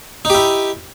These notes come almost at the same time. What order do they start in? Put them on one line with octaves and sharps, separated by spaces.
D#4 G4 E4